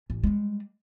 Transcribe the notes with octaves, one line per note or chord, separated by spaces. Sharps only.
A1
G3 G#3